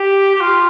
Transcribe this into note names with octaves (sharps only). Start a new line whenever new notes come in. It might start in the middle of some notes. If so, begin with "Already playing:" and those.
Already playing: G4
G4
F4